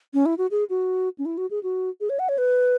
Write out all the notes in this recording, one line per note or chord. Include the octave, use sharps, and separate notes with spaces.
C#4
E4
F#4
G#4
F#4
C#4
E4
F#4
G#4
F#4
G#4
C#5
F#5
C#5
B4